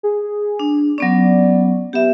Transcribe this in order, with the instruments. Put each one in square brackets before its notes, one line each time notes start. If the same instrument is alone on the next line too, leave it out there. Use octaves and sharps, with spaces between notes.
[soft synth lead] G#4
[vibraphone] D4
[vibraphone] F#3 B3 C#4 [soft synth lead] D5
[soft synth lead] B3 [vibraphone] G4 E5